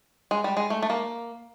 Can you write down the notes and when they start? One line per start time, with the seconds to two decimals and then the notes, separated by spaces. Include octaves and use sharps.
0.31 G#3
0.44 G3
0.57 G#3
0.70 A3
0.82 A3
0.90 A#3